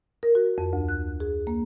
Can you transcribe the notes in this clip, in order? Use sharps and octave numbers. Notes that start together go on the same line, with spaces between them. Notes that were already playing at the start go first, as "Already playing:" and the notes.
A#4
F#4
F2
D2
F#6
G#4
A#3